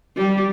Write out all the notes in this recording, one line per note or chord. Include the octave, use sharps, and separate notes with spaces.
G3